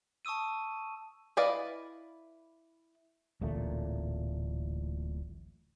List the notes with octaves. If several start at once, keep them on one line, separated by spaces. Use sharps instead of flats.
A5 C#6 D#6 E6 D#7
E4 B4 D5 D#5 F5
D1 A1 A#2 A3